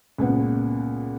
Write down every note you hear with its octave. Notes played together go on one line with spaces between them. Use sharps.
C#2 A#2 B3 F#5